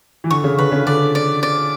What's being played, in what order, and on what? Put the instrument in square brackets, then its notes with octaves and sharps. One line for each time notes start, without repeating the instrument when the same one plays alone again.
[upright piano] E3
[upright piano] D3 [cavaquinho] C#6
[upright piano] C#3
[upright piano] D3 [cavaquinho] B4
[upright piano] C#3
[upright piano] D3 [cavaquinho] D5
[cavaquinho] D5
D5